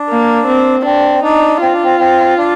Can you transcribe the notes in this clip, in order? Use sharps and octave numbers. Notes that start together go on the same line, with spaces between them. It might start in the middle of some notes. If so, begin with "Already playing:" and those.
Already playing: D4
A#3
C4
C4 D4
D4 D#4
C4 F4
D4
C4
C4
D4